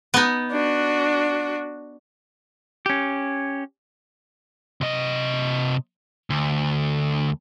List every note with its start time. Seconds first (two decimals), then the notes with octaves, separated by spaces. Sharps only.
0.14 B3 D#4
0.51 D4 F#4
2.86 C#4 G4
4.81 C3 D#5
6.30 D2